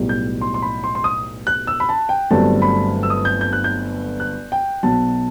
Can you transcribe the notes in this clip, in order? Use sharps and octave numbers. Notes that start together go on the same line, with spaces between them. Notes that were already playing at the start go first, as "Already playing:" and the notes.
Already playing: B1 A2 G3
G6
C6
C6
B5
C6
C6
D#6
F#6
E6
B5
A5
G5
G1 G2 F#3 A3 C4 A5
B5
E6
D#6
G6
G6
F#6
G6
F#6
G5
B1 B2 F#3 A5